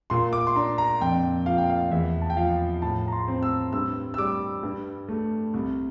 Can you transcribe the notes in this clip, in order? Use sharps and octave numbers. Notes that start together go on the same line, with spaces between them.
A#2 C6
D6
C6
D4 A#5
A#5
F2 G5
F3 F5
G5
F5
E2 E5
A5
G5
F3 F5
A2 A5
A#5
C6
C4
E6
G2 E6
E6
G3 D6
G2
A3
C2